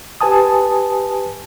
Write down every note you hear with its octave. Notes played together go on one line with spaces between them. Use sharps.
G4 B4 G#5 A5 D#6